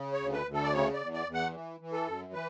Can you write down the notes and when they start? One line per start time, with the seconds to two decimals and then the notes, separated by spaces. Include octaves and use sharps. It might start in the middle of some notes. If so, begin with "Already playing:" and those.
Already playing: C#3
0.13 C#5
0.20 D2
0.33 B4
0.46 D2
0.53 A4
0.64 D5
0.73 C#3 C#5
0.94 D5
1.00 E2
1.14 D5
1.27 E2
1.34 F#5
1.53 E3
1.80 E3
1.93 A4
2.07 F#2
2.33 E3 B4